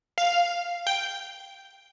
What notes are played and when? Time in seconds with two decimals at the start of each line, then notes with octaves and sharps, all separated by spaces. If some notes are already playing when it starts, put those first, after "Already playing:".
0.18 F5
0.87 G5